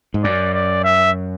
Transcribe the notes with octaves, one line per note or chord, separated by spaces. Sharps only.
G#2
F#2 D5
D5
E5